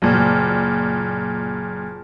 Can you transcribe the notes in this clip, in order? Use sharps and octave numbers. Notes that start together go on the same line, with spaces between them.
F#1 A#2